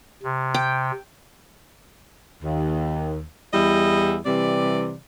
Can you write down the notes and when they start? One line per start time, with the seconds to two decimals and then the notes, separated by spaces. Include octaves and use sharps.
0.23 C3
0.54 G5
2.43 D#2
3.52 E2 G3 E4 D#5
4.25 C3 E3 G3 D5